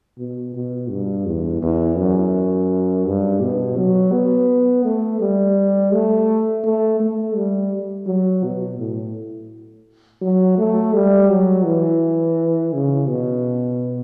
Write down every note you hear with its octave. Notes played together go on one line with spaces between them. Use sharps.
B2
B2
G2
E2
E2
F#2
G2
B2
F#3
B3
A3
G3
A3
A3
A3
G3
F#3
B2
A2
F#3
A3
G3
F#3
E3
C#3
B2